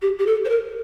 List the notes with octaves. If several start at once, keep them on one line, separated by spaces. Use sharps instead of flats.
G4
G4
A4
C5
A#4